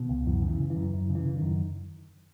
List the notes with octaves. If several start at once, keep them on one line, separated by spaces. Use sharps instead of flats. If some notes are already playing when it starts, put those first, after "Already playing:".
Already playing: B2 D#3
C#2
F#2 E3
C#3
E3
C#3
E3
F#2
F#2
C#3
E3
C#3
F#2 D#3